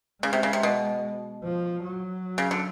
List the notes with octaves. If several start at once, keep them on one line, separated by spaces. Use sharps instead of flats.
C#3 G#3
C3
C#3
C3
B2
F3
F#3
C#3
D3